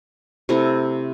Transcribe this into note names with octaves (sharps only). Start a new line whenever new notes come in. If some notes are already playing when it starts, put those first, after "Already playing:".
C3 A3 E4 A#5